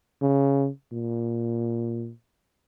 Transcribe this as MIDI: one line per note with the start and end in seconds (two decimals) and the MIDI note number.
0.22 0.68 49
0.93 2.11 46